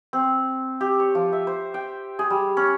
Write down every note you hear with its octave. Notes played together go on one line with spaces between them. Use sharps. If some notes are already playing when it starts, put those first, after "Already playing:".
C4
G4
C#5
F3
E5
C5
G5
G#4
G3
C#4